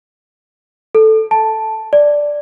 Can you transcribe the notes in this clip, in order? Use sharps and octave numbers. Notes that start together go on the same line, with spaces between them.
A4
A5
D5